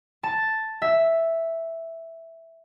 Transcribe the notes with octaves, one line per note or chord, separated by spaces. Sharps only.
A5
E5